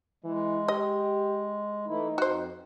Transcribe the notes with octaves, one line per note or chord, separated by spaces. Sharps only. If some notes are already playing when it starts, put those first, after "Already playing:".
E3 G#3
G4 D#5
E3 A3 D#4 E4
F2 F#4 C5